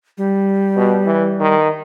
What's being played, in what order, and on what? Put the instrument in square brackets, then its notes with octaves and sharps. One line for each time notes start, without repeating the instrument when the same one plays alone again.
[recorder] G3
[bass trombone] B2
E3
D#3